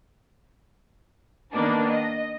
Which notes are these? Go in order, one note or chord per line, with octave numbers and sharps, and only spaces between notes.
D#3 A#3 B3 D4 D#4
D#5